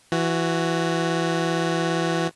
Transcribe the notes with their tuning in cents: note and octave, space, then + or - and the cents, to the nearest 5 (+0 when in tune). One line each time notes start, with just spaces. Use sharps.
E3 +15 F#4 +0